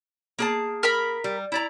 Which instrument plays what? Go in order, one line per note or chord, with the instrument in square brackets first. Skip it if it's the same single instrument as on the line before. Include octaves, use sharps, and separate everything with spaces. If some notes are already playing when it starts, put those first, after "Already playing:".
[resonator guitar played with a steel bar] A#3 G#4 A5
[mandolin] A#4 A#5 B5
[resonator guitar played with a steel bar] G3
E4 D5 A#5